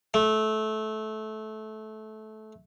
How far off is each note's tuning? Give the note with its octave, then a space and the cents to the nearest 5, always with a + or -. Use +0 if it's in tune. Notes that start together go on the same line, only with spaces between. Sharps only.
A3 -20